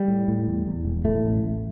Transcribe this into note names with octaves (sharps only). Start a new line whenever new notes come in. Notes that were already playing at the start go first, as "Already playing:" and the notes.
Already playing: G3
A2
A2
E2
E2
E1
A2 A3
A1
A1